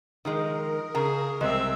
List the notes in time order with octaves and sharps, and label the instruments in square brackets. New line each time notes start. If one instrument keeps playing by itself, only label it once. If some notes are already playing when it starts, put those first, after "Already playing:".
[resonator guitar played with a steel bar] D#3 F3 G#3 [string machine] A#4 [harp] D#6
[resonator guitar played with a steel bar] C#3 A#5 [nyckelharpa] G#4
[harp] C2 [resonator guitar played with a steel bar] G#3 [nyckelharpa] C4 E5